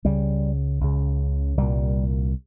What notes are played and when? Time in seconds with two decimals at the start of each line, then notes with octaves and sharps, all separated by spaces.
0.05 C#2 C#3 G3
0.81 C#2 C#3
1.57 C2 A#2 G3